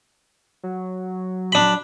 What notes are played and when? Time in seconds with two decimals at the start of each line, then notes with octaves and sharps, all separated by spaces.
0.63 F#3
1.52 D4 B5